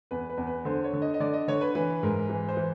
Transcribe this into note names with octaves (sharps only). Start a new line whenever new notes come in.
E2 B4
B4
E2
B4
D3 C5
C#5
D3
D#5
D#5
D3 D5
D#5
D3 C#5
B4
E3 B4
G#2 A#4
E3
C5
E3